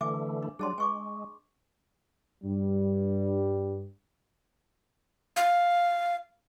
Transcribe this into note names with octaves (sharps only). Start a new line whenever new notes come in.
D3 E3 A3 E5 G#5 D6
D4
F#3 G3 D4 G#4 A5 C6
G#3 G#5 C#6 D6
G2 G3
F5